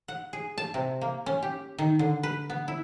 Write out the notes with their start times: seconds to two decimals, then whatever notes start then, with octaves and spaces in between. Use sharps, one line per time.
0.08 F#5
0.33 G#4
0.58 A5
0.74 C3
1.01 A#3
1.26 C#4
1.43 G4
1.78 D#3
1.99 D3
2.23 B4
2.50 B3
2.68 E4